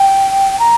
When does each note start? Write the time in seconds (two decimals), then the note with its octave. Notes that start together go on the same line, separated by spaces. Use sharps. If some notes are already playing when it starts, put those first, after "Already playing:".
Already playing: G5
0.59 A#5